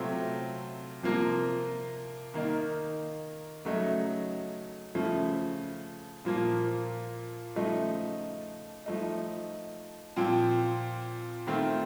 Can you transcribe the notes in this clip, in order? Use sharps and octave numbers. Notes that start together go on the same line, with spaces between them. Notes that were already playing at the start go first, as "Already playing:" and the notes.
Already playing: C3 F#3 A3 C4 F4
C3 F3 A#3 F4
D#3 A#3 D#4
C#3 F#3 A3 D#4
C#3 F3 A3
A#2 F3 A#3
C#3 F3 A3 D#4
F3 A3 D#4
A#2 F3 C4
D#3 A3 C4 F4